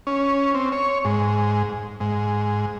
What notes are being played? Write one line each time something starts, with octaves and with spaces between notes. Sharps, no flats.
C#4
C4
C#5
G#2
G#2